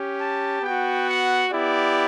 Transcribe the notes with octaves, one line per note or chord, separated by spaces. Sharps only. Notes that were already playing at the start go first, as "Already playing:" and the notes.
Already playing: C#4 G4
A5
B3 F#4 G5
F#5
B3 E4 G4 D5